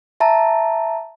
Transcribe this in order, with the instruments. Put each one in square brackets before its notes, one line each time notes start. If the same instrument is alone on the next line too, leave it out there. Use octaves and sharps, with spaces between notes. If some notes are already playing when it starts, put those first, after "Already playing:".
[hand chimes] E5 A5 A#5